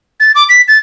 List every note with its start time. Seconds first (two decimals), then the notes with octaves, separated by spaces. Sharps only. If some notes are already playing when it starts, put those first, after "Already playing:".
0.20 A6
0.35 D6
0.49 B6
0.68 A6